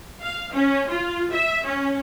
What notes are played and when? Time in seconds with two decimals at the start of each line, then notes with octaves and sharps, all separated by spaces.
0.22 F5
0.54 C#4
0.90 F4
1.32 E5
1.66 C#4